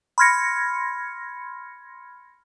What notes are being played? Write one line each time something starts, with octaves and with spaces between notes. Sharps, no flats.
B5 C6 F6 G#6 A#6 C#7